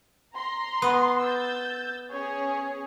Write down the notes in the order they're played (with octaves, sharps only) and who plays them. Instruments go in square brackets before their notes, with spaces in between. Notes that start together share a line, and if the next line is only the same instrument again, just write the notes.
[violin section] A#5 C6
[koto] B3
[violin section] E6 G6 A6
C#4 G#4 C#5